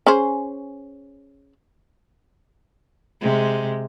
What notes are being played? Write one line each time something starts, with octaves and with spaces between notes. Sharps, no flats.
C#4 G#4 C5
C3 G#3